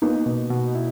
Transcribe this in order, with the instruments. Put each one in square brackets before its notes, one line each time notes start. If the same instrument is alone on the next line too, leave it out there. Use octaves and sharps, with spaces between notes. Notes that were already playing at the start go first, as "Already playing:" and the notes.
[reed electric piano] A#3 [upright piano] B3 D#4
[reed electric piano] B2
B2
E4